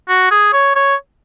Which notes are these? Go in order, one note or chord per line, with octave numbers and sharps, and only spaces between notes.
F#4
G#4
C#5
C#5